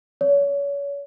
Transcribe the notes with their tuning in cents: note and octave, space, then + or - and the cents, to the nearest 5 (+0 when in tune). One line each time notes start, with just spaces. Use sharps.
C#5 +30